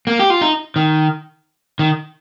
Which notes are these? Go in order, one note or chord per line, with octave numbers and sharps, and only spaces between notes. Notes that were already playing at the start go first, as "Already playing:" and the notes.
A#3
G4
F4
D#4
D#3
D#3